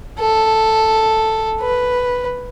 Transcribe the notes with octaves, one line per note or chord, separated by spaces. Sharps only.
A4
B4